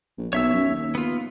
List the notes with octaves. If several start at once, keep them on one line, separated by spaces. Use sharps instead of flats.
A#1
B1 C#5 E5 E6
F#2
D#2
B3 F4